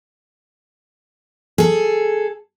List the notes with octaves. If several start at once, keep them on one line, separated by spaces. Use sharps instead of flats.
G#4 A4